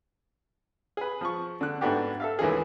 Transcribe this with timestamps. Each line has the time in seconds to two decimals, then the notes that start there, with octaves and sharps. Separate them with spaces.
0.97 G#4 B4
1.21 F3 C#6
1.61 D3 F#6
1.81 G#2 A3 B3 D4 F#4 G4
2.20 A4 E5 F5
2.39 C#2 D#3 E3 A3 G#4